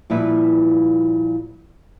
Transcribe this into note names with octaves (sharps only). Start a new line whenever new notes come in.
A#2 F3 G3 E4 B4 E5